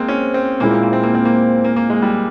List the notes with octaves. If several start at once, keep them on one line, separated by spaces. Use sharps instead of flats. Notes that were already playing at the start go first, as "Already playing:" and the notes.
Already playing: G#3 A#3 C4
C#4
C4
A#2 G#3 A#3 E4
C4
A#3
C4
A#3
C4
A#3
A#3
A#3
G#3
G3